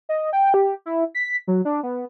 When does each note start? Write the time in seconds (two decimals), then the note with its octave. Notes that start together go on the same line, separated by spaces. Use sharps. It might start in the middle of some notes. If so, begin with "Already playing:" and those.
0.09 D#5
0.33 G5
0.54 G4
0.86 E4
1.15 B6
1.47 F#3
1.65 D4
1.83 B3